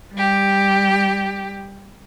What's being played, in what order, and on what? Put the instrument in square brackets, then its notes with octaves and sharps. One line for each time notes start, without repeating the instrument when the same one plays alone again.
[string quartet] G3 G4